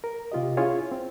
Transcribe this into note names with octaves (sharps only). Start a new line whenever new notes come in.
A#4
C3 F4 G4 D#5
C#4 E4 F4 G#4 C#5
C4